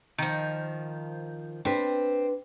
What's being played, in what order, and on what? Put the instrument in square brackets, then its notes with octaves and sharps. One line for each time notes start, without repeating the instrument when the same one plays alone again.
[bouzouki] D#3 F3
[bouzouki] C4 [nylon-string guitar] D4 B4